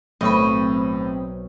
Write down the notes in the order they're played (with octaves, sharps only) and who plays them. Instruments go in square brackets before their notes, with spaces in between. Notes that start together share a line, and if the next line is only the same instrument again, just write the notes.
[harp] B1 C#6 [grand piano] A2 [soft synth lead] C4 [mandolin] D#5 B5